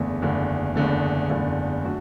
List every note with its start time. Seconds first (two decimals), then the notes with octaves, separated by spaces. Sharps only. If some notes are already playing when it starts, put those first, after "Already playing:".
Already playing: F#1 E2 D3 A3
0.22 F#1 E2 D3 A3
0.76 F#1 E2 D3 A3
1.30 F#1 E2 D3 A3
1.84 D3 F#3 A3 F#4